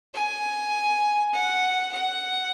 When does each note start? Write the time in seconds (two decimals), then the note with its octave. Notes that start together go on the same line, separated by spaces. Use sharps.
0.14 G#5
1.33 F#5
1.93 F#5